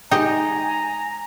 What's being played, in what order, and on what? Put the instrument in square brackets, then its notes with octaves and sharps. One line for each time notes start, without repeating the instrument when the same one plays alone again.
[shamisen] G#3 G5 [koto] D#4 G4 D#5 [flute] G#5 [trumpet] A#5